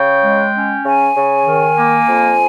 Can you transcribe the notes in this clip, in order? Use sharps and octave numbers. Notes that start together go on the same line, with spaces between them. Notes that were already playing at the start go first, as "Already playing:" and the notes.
Already playing: C#3 G5
G#3
C#4
C#3 G#5
C#3
D#3
A#3
F2